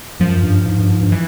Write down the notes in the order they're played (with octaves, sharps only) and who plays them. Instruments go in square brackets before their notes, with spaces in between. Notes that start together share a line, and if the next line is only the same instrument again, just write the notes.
[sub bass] F#2 [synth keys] F3
[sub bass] G2
G#2
G2
G#2
G2
[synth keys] E3